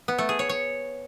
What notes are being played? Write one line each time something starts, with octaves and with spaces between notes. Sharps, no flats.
B3
A3
G#4
C#5
C#5